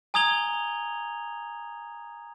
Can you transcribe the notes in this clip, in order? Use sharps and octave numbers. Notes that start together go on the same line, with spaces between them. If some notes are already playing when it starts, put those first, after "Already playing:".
G#5 A#5 D#6 G#6 F7 G7